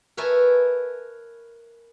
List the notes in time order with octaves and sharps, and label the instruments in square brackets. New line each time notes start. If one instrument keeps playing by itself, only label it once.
[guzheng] A#4 B4 C#5 E5 G#5 A5